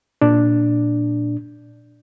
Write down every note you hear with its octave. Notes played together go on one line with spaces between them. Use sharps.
A#2 D4